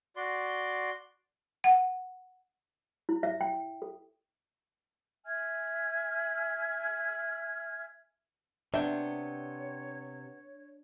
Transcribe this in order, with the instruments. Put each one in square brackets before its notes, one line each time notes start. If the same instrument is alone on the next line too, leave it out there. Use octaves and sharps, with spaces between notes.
[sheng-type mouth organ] F#4 D5 C6
[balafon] F#5
[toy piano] E4
E5
G5
A4
[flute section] E5 G#5 F6 G#6
[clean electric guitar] C3 G5 [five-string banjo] B3 E5 [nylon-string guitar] D4 [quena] C#5